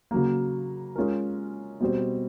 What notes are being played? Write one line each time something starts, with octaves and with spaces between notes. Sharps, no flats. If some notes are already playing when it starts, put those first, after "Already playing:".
C#3 F#3 A#3
G#3 C#4 F4 A#4
B2 G3 C4